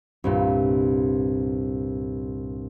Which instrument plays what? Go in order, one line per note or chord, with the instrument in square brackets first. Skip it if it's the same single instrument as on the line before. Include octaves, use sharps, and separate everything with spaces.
[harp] C2 G2 A#2